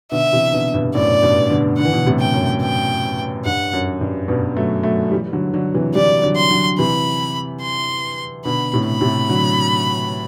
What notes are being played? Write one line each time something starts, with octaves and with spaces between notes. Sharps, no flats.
B2 D3 E5
C3 E3
B2 D3
G2 B2
F#2 A2 D5
G2 B2
B2 D3
D3 F#5
E3
B2 D3
A2 C3
G5
F#2
G5
G2 F#5
F#2
G2
G2 B2
F#3 A3
F#3 A3
E3 G3
D3 F#3
D3 F#3
C3 E3
E3 G3 D5
D3 F#3
C6
D3 F#3
C3 E3 B5
C6
B2 D3 B5
A2 C3
B5
A2 C3
D3 F#3